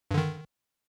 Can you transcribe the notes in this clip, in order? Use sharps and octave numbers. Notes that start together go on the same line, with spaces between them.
G2 D3 D#3